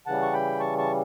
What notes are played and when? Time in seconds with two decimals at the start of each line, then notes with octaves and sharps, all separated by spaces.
0.07 C#3 E3 G3 F#5 A5
0.22 C#6
0.33 G5 B5
0.60 A5 C#6
0.78 A5 C#6